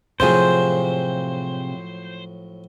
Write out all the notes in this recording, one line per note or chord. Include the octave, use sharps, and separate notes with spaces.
A2 C3 F3 F#3 F4 G#4 C5